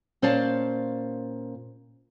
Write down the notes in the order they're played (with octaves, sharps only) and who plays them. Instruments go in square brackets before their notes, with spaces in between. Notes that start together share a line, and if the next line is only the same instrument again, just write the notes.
[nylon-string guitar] A#2 C#4 C5 D5 F5 A5